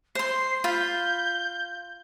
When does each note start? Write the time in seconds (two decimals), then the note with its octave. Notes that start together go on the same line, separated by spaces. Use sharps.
0.15 C5 C6 C7
0.64 F4 B5 G6